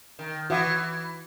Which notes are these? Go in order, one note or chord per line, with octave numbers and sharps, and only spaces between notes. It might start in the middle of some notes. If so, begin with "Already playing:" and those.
D#3
E3 F#4 E5 D#6